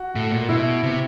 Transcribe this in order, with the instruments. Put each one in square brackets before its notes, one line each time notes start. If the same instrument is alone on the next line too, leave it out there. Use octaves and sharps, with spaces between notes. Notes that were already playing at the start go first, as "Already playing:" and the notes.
Already playing: [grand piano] F#4
[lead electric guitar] A2
A#2
[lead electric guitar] B2 [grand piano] E4
[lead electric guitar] C3